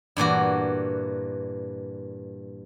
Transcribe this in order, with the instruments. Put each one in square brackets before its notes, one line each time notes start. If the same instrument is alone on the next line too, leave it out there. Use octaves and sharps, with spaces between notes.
[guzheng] G2 A#2 E3 F#4